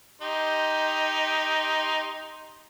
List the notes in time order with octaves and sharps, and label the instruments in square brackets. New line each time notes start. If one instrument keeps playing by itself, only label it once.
[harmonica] D#4 G4 C6